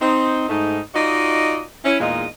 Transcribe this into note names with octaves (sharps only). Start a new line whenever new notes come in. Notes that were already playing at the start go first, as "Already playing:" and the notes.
C4 D#4
G#2 A3 D#4
D#4 F4 F#4 D5 D#5
C#4 E4
E2 A#2 G#3 D#4 D#5 F5